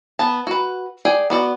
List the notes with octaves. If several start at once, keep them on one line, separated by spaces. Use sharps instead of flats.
B3 A5
F#4 B4
G#4 D5 G5
B3 F#4 D5